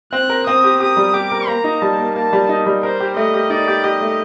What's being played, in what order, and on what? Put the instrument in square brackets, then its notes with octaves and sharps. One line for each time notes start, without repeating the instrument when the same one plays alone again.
[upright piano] C4 [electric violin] F#6
[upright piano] A#4
[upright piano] C4 [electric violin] D#6
[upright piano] G4
[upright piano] G4 [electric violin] D#6
[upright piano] G3
[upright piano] G4 [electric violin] D6
[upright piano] A#4
[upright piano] A#3 [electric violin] A#5
[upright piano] D#4
[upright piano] G3 [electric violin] A5
[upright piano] A#3
[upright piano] A#3 [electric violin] A5
[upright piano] G3
D#4
G3
[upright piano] A#4 [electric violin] C5
[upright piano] G4
[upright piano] A3 [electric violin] D#5
[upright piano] G4
[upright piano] D#4 [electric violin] D5
[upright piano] G4
[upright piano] G4 [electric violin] D#5
[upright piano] A3